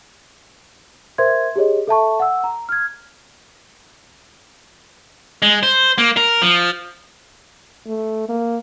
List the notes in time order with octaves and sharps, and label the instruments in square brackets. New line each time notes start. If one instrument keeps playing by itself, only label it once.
[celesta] A#4 C5 E5 C6 G#6
G4 G#4 C#5 D#5
A4 E5 A5 C#6
F#5 E6
A#5
F6 G#6
[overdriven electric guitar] G#3
C5
A#3
A#4
F3
[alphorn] A3
A#3